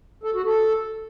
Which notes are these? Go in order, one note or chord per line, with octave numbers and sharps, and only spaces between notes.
A4
F#4
A4